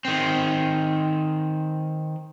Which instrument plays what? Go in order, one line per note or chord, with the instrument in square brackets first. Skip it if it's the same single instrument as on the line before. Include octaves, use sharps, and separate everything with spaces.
[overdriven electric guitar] D#3 C4